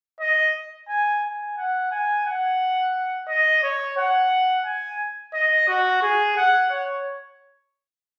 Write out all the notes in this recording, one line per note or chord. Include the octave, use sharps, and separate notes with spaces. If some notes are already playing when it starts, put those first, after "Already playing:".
D#5
G#5
G#5
F#5
G#5
F#5
D#5
C#5
F#5
G#5
D#5
F#4
G#4
F#5
C#5